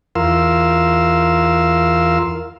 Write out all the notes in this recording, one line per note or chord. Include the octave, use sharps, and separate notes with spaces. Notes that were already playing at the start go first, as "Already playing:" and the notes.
E2 F4 A#4 F5 C6 E6